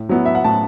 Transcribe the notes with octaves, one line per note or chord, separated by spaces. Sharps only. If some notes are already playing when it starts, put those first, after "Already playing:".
Already playing: A2
F#3 B3 E4
E5
F#5
A2 A5